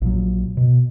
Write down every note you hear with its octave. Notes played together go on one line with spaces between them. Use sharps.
A#1 A#2 F#3
B2